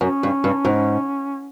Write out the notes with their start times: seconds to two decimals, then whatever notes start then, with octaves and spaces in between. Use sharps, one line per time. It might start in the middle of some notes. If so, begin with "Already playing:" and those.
0.01 F#2 C#4
0.23 G2
0.44 G2
0.65 G#2